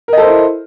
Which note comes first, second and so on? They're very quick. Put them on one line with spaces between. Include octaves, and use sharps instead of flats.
A#4 D#5 A4 C5 E4